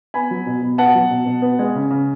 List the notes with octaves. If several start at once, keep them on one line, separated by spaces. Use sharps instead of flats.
B3 G#5 B5
F#3
B2
B2
B3 F#5 A5
F#3
B2
B2
B3
G#3
C#3
C#3